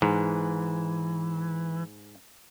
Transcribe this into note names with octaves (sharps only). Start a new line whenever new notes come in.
G#2 E3